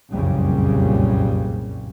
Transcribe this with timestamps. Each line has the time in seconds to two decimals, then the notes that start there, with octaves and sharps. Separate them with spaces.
0.13 F#1 C2 F2 A#2 C#3 G3